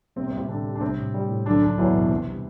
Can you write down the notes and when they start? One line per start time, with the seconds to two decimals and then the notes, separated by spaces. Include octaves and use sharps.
0.16 C3 G3 C4
0.27 C3 C4
0.32 G3
0.38 C3 C4
0.49 A2 D3 D4
0.66 G4
0.75 D4
0.81 C3 G3 C4
0.98 A2
1.14 G3
1.29 A2
1.46 D3 F#3 D4
1.62 C2 D3 D4
1.78 E2 E3 F#3
1.94 C2 B2
2.10 C3 C4
2.27 G3